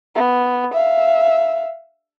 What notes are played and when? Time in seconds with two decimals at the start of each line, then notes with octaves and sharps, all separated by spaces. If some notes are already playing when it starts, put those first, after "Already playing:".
0.16 B3
0.74 E5 F5